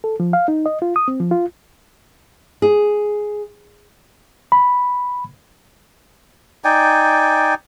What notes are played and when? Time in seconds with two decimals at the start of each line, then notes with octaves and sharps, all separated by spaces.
0.04 A4
0.20 F3
0.33 F5
0.48 D#4
0.66 D#5
0.82 F4
0.96 D#6
1.08 C4
1.20 F3
1.31 F4
2.62 G#4
4.52 B5
6.64 D#4 D5 G5 G#5